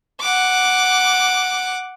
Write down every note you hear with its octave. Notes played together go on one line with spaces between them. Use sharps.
F#5 D6